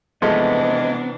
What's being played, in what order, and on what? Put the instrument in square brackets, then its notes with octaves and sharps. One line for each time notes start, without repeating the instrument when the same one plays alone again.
[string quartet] C3 E3 D4 [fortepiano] F3 G#3 A3 [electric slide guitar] B3 [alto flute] D#5